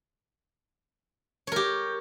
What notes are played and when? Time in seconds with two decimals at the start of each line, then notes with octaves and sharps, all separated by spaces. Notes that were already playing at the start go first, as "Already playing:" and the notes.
1.47 C#5
1.52 A#4
1.56 G4